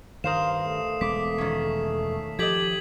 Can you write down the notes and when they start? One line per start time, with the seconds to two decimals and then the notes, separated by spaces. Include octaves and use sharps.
0.24 G2 D#3 A#4 C5 F5 D#6 C7 E7
0.65 A3
1.01 E1 G#3 B3 D6 B6
1.38 D#3 C#4
2.39 F3 G4 A4 D#5 G#6 B6 F#7